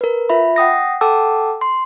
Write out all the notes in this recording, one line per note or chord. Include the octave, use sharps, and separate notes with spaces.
A#4 B4
F4 E5 B5
F#5 G5 D#6 A#6
A4 F#5 G5 A5 D6 E6
C6